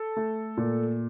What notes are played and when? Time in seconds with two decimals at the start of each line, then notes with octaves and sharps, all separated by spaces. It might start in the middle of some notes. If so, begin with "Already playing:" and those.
Already playing: A4
0.17 A3
0.57 A#2